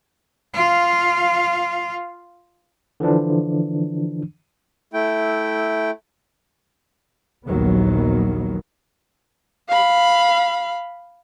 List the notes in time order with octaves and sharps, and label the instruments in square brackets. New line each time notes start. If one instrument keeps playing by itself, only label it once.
[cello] F4 F5
[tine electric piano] D3 E3 F3 D4
[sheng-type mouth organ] A3 E4 G5
[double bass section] A#1 D#2 D#3 F#3 B3
[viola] F5 B5